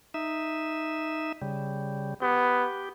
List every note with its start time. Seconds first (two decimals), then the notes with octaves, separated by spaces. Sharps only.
0.14 D#4 E5
1.42 C#3 G3
2.22 B3 G4